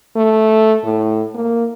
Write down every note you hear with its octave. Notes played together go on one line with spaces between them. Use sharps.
A3
A2
A#3